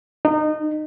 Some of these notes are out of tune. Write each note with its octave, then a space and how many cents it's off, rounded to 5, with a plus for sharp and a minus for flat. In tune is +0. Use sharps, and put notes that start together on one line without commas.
D#4 -25